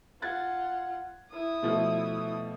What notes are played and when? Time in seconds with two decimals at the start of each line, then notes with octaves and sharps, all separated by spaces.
0.22 F4 F#5 F#6 G#6 A6
1.30 E4 D#6
1.62 B2 F3 A3